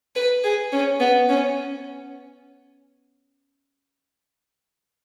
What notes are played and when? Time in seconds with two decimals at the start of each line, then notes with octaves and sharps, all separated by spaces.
0.15 B4
0.43 G#4
0.72 C#4
1.00 B3
1.29 C#4